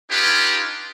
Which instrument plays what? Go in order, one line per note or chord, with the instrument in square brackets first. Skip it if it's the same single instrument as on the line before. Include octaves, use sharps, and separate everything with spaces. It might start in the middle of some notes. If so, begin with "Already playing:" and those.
[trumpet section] D4 D#4 F4 G4 G#4 B4